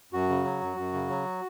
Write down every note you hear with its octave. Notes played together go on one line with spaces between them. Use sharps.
F#2 F#4
C#3
F#3
F#2
F#2
C#3
F#3